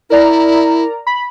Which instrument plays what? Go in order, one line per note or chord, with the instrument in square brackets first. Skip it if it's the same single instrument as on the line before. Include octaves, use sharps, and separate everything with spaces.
[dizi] E4 [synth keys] A#4 D5 A#5
[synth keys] B5